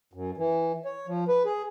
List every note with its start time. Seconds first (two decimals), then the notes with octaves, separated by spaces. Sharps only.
0.13 F#2
0.37 E3
0.85 C#5
1.07 F3
1.28 B4
1.45 G#4